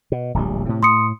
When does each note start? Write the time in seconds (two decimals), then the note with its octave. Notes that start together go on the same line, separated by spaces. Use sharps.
0.12 B2
0.34 D1 A#1 G3
0.66 A2 C3
0.83 A2 C6 D#6 C#7